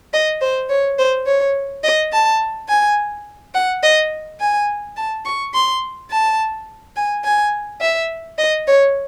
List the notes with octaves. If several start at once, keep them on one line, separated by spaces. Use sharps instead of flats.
D#5
C5
C#5
C5
C#5
D#5
A5
G#5
F#5
D#5
G#5
A5
C#6
C6
A5
G#5
G#5
E5
D#5
C#5